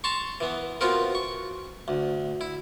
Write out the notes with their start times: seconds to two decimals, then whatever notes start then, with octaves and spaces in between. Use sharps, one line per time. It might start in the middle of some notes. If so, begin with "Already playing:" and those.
0.04 A5 A#5 C6 C#6
0.41 E3 B3
0.81 B3 C4 F4 F#4 A#4
1.15 C#6
1.88 D2
2.41 E4